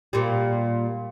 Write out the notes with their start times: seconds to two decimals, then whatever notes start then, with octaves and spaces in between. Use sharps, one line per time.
0.13 A#2 G3